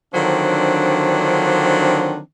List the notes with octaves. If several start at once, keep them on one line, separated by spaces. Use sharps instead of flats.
D3 D#3 F3 F#3 C4 D4